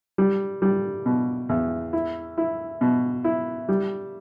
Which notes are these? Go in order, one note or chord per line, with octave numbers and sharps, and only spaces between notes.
G3
G3
B2
E2
E4
E4
B2
E4
G3